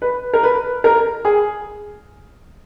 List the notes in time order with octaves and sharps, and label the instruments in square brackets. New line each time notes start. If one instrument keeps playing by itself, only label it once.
[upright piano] B4
A#4
B4
A#4
G#4